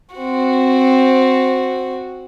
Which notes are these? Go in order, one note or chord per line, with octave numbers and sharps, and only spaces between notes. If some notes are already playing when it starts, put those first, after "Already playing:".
C4 F#4